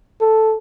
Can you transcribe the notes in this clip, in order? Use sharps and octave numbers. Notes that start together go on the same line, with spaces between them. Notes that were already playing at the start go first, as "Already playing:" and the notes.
A4